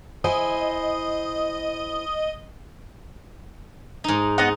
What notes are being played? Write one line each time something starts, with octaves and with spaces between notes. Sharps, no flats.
E4 C5 D#5 G#5
G#2 D#4
B3 D#4 D#5 F#5